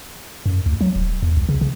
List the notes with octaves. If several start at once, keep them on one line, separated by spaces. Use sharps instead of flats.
F#2
D2
F#3
D#1
E2
C2
C#3
C#3